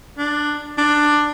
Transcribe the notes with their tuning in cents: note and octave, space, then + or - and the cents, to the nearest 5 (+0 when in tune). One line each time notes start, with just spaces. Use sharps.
D4 +10
D4 +10